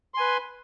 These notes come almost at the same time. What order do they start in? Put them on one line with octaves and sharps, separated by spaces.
C6 G#5 B4